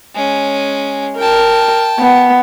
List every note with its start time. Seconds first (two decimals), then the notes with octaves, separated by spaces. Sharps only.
0.15 G#3 C#4
1.18 A#4 G5 A5
1.99 B3